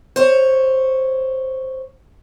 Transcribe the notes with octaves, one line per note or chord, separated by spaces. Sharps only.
C5 C#5